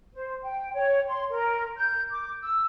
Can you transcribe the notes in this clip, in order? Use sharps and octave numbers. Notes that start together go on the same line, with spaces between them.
C5
G5
C#5
C6
A#4
G6
D6
E6